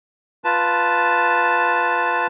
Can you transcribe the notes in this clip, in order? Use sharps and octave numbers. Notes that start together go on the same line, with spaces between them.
F4 B4 A5